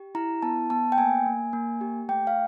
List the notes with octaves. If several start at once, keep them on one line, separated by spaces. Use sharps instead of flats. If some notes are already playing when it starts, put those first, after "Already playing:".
Already playing: G4
E4 A#5
B3 A5
B3 A5
G5
A#3 G#5
A#3
A#3
G4
A3 G5
F5